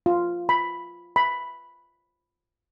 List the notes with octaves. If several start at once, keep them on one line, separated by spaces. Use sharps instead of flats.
F4
B5
B5